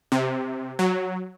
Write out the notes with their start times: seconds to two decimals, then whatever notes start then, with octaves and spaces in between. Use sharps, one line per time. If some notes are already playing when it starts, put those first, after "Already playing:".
0.12 C3
0.79 F#3